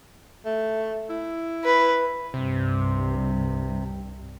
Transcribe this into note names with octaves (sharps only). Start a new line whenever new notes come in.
A3
E4
B4
C2 G2 C3